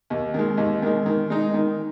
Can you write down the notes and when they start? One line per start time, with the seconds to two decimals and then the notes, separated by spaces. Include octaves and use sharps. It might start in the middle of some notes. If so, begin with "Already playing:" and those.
0.10 D#2
0.34 D#3 G#3
0.58 D#2
0.82 D#3 G#3
1.06 D#3
1.30 G#3 D#4
1.54 D#3